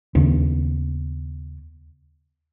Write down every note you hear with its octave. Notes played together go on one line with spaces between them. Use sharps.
D#2 C#3 B3